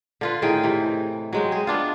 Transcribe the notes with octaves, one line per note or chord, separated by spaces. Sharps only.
D3 F4 B4
A2 D#3 G#4 G5
C3 E3
F#3 G#3 C4
G#4
B3 D4 F4